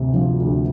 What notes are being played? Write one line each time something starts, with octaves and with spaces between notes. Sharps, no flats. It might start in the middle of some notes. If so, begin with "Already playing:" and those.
Already playing: D2 C3
F3
D2